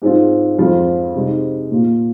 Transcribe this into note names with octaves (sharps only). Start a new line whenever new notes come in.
G#2 G#3 C4 F4
F2 F3 G#3 F4
C3 G#3 D#4
A#2 A#3 F4